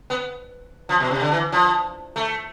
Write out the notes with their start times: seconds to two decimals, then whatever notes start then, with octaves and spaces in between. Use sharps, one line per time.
0.10 B3
0.89 F3
1.00 B2
1.11 C3
1.21 D3
1.31 E3
1.52 F3
2.16 A3